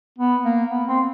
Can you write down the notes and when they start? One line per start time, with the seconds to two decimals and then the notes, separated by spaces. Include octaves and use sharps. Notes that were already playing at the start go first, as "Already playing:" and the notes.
0.18 B3
0.45 A#3
0.70 B3
0.88 C4